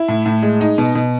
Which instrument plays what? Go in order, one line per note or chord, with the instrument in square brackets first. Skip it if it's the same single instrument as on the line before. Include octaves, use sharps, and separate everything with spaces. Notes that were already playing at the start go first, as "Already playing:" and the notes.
Already playing: [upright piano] E4
A2
A2
G#3
D#4
B2
B2